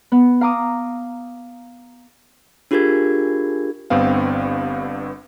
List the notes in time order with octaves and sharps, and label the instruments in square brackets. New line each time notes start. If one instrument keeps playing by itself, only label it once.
[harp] B3
F5 A#5 D6 D#6
[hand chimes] D4 F4 G4 G#4 A#4 G#6
[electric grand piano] G1 G2 B3 C4 F5